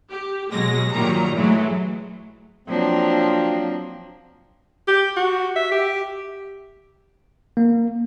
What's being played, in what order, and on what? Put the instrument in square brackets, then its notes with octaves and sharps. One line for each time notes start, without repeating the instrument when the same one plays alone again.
[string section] G4
B2 F#3 G#3 A#6
G2 A#2 D#3 F#3 G3 A#5
E3 F#3 G#3 A3
[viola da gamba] F3 A#3 D4 [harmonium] F#3 C4
[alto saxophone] G4
F#4
E5
G4
[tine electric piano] A#3